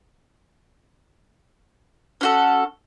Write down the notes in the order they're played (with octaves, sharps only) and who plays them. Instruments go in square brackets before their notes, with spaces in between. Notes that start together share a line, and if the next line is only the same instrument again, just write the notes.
[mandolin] C#4 F#4 A4